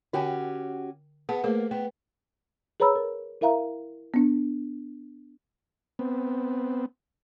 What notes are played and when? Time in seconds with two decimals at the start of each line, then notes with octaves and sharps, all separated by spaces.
0.13 D3 C#4 F#4 G4 G5 G#5
1.29 B3 G#4 F#5 A5
1.44 A3 A#3 G#4 C5
1.71 B3 G5
2.80 G#4 B4 C#5 A#5 B5 E6
2.96 A#4
3.41 E4 A#4 E5 F5 A#5
4.14 B3 D4
5.99 B3 C4